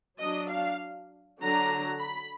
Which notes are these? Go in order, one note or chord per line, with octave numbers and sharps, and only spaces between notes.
F#3 D4 D#5
F5
D3 F#3 D4 A#5
B5